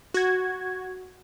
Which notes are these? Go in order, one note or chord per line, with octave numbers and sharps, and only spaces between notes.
F#4 G#6